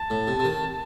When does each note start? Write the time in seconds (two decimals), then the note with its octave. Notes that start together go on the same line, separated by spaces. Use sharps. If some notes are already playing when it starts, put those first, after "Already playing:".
Already playing: A5
0.10 A2
0.27 C3
0.39 C3
0.44 D#3